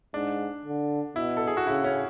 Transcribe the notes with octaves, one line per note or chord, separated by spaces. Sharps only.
G#2 D4
D3
B2 E4
A4
G#4
F#4
C#3 E4
C#4